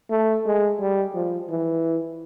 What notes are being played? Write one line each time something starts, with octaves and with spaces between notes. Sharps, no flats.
A3
G#3
G3
F3
E3